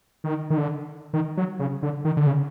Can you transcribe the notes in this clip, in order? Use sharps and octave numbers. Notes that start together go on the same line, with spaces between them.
D#3
D#3
D3
D#3
F#3
C#3
D3
D#3
D3
C#3